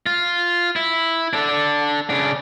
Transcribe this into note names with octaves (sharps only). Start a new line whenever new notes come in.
F4
E4
D4 A4
C#3 D4